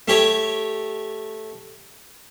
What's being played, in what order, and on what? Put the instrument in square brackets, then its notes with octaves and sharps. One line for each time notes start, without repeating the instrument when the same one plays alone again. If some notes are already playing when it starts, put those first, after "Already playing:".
[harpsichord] A3 G4 C#5